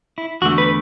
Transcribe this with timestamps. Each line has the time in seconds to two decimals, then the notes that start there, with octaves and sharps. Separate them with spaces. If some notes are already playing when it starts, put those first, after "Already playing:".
0.18 E4
0.41 E2 D3 A3 F#4
0.58 B4